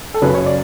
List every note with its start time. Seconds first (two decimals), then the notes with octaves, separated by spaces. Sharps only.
0.14 A4
0.22 F#2 C#3 F#3 B4
0.34 C#5
0.46 D5